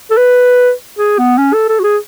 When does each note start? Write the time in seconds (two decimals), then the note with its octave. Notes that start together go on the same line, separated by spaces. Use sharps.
0.11 A4
0.17 B4
0.99 G#4
1.18 B3
1.38 C#4
1.54 A4
1.69 A4
1.79 F#4
1.84 G#4